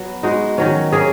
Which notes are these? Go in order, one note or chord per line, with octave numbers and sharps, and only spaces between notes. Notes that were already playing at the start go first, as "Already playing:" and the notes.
Already playing: F#3 B3
G#3 D#4 F#4
D#3 F#3 C#4
A#3 C#4 G#4